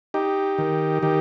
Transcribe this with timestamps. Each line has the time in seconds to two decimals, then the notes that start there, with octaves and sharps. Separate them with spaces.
0.14 D#4 G4
0.58 D#3
1.02 D#3 G4